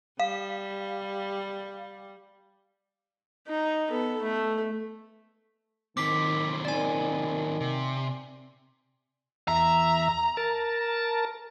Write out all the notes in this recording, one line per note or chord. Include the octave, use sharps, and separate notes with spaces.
G3 F5
D#4
B3 A4
A3
D#2 D#3 C4 D6 B6
D#3 D5 G#5
C3
E2 E5 A#5
A#4 A5